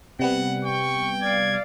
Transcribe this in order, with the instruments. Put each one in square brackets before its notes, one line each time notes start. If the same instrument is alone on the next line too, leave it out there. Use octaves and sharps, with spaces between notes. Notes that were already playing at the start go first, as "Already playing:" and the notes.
[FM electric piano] C3 G3 B3 [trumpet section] F#5
[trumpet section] G5 [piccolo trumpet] C#6
[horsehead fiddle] D5 F5 [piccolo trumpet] G#6